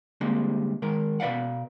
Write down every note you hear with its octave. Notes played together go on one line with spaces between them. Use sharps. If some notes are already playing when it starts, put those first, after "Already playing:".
D3 G3 G#3 A#3 C4
D#3 G#3 A#4
B2 B4 D5 F5 F#5